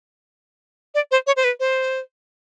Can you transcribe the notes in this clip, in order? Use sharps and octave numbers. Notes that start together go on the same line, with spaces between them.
D5
C5
C#5
C5
B4
C5